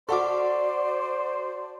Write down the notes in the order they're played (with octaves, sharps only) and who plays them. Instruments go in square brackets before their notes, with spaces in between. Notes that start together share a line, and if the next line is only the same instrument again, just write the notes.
[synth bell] F#4 F#5 C#6 [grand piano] A4 D6 [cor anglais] C5 [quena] D5